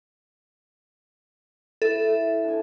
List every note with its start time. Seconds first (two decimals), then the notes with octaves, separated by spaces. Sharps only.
1.82 E4 A4
2.44 D4 G#5